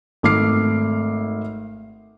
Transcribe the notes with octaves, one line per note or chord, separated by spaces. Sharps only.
G#1 A3 D6 F6 C7